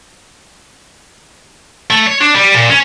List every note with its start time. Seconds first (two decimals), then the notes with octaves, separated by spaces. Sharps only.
1.90 A3
2.07 C#5
2.20 D4
2.35 G3
2.54 A#2
2.70 C#4